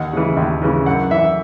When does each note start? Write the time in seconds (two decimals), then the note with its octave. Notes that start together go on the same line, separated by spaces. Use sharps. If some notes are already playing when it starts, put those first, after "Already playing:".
Already playing: D#2 F#5
0.13 C#3 E3
0.37 D#2
0.62 C#3 E3
0.86 F#2 F#5
1.11 E3 E5